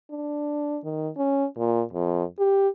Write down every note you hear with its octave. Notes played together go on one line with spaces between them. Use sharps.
D4
D#3
C#4
A#2
F2
G4